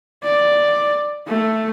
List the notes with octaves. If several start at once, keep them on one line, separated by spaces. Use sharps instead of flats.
D5
A3